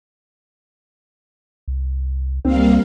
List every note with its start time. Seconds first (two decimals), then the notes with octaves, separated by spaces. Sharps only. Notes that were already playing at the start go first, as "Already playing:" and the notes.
1.68 C2
2.45 C#2 G3 A#3 C4 F5